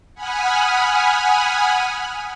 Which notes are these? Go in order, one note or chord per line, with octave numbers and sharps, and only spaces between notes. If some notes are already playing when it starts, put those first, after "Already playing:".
F#5 G#5 B5 D#6 F6